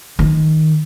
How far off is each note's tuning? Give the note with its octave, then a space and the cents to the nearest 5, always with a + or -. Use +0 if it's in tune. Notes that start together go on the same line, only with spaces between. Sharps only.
D#3 +10